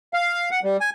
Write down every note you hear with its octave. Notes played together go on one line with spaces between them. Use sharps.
F5
F#5
G3
G#5